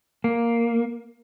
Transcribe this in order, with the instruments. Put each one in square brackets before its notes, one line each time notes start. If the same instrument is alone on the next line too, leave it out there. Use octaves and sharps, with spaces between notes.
[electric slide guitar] A#3